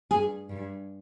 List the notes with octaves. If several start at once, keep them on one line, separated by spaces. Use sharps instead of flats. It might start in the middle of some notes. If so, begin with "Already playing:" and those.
G2 G#4
G2